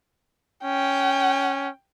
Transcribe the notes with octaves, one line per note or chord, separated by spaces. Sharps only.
C#4 G5